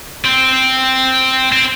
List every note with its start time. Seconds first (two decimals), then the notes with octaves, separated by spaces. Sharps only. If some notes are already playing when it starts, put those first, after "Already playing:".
0.25 C4
1.52 C4